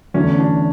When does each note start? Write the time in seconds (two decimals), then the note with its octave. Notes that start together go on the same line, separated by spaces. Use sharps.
0.14 E2 D3 F#3 A3 C#4
0.39 D4